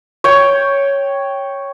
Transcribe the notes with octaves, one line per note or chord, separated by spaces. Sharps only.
C#5 G5